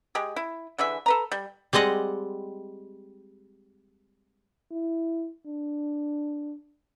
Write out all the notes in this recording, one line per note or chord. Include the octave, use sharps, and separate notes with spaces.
G#3 G4 G#4
E4
D3 E3 G#4 E5
A4 B4 A#5
G3
G3 G#3 C4 D#5 F#5
E4
D4